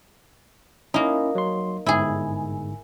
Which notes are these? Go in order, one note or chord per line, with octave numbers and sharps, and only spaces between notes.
A#3 C#4 D#4 E4
F#3 C6
G1 G#2 E4 G#4